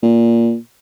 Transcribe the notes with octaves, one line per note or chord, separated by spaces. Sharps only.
A#2